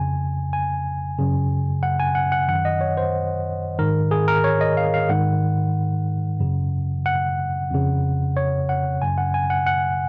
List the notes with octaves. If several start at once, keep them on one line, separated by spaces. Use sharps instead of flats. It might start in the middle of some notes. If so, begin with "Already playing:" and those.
Already playing: F2 C#3 G#5
G#5
F#2 C#3
F#5
G#5
F#5
F#5
F#2 D#3 F#5
D#5
C#5
C5
G#2 D#3 A#4
G#4
A#4
C#5
D#5
F5
F5
G#2 D#3 F#5
F#2 C#3
F#5
F2 C#3
C#5
F#5
F#2 C#3 G#5
F#5
G#5
F#5
F#5